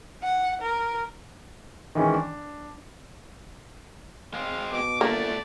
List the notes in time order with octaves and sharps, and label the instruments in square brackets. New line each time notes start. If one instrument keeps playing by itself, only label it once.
[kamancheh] F#5
A#4
[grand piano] D#3 E3 G#3 C#4
D4
[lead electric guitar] G#3 C4 [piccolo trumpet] F5
[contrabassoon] B2 [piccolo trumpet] D6
[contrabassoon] G1 [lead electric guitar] D3 A3 [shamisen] A#3 [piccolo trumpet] D5